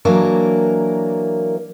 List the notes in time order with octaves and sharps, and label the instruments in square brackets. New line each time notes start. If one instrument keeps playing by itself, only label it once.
[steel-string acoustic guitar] E3 F#3 A#3 D4 A#4